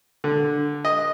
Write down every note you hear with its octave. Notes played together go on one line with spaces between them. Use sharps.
D3
D#5